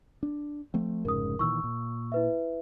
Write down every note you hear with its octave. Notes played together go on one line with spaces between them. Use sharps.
D4
F3 A3 C4
F1 G#2 C#3 A#4 D#6
A#2 D#3 E3 C#6 E6
A#2
E4 B4 E5